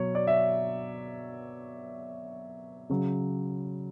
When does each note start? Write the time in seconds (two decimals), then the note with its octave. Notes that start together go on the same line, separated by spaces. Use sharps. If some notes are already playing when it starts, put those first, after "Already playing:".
Already playing: B2 F#3 C#5
0.15 D5
0.27 E5
2.89 C#3 F#3